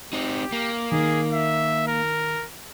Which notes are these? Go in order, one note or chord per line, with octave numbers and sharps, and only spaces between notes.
C4 D#4 G4
A#3
D#3 G#4
E5
A#4